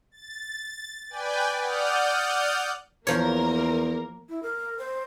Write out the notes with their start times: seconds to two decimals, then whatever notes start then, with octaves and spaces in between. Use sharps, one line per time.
0.11 A6
1.10 B4 D5 G5 G#5
1.59 D5 F#5 D#6 F6 G6
3.07 E2 F3 A#3 A#4 C#5
4.29 E4
4.43 A#4
4.79 C5